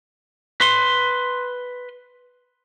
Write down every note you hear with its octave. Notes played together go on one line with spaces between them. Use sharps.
B4 C6